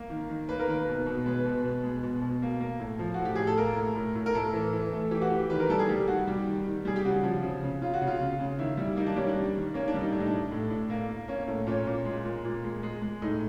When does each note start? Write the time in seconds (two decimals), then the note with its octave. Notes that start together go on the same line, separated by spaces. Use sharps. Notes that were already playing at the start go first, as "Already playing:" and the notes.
Already playing: A#3
0.10 D#3
0.29 D#3
0.49 A#3 B4
0.59 A#4
0.68 D#3 B4
0.88 B2
1.06 B2
1.26 G#3 B4
1.45 B2
1.64 B2
1.84 G#3
2.03 B2
2.22 B2
2.42 A#3
2.61 A#3
2.80 A2
2.99 F3
3.14 F#4
3.19 A2
3.25 G4
3.35 A2 G#4
3.47 A4
3.58 A#3 A#4
3.76 A2
3.96 A2
4.15 A2
4.26 A#4
4.35 A2 A4
4.54 E3
4.73 E3
4.93 A3
5.11 E3 G4
5.22 F#4
5.30 E3 G4
5.50 D#3 B4
5.60 A#4
5.69 G3 A4
5.79 G#4
5.89 G3 G4
6.07 D#3 F#4
6.27 G3 G4
6.47 D#3
6.66 D#3
6.85 G3 G#4
6.96 G4
7.04 C#3 F#4
7.23 F3
7.42 C#3
7.63 C#3
7.81 C#3 F4
7.94 F#4
8.01 C#3
8.07 F4
8.20 C#3
8.39 C#3
8.59 D#3 E4
8.77 G3
8.97 A#3 D#4
9.06 D4
9.16 G3 C#4
9.27 D4
9.36 D#3
9.55 D#3
9.74 A#3 C#4
9.88 D4
9.94 G3
10.01 D#4
10.12 A2 D4
10.20 D#4
10.27 D4
10.32 A2
10.52 A2
10.70 A2
10.90 A#3
11.09 A#3
11.28 A#3 C#4
11.47 A2
11.67 A#2 C#4
11.87 A#2
12.05 G#3
12.25 A#2
12.45 A#2
12.64 G#3
12.83 G#3
13.02 G#3
13.22 A2 D#4